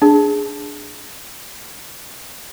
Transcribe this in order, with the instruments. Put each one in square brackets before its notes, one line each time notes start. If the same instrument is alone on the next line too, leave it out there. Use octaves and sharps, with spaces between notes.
[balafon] D4 G#4